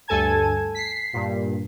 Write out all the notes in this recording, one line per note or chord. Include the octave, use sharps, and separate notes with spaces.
D2 G2 A4 G#5 A5 G#6
B6 C7
G2 A#2